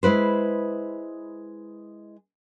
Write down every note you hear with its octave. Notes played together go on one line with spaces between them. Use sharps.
G#3 E4 B4 C5